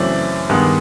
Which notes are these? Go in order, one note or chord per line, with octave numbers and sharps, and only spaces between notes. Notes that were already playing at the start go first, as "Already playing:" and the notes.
Already playing: F#2 C#3 E3 A3 C4 D5
G2 D#3 G#3 B3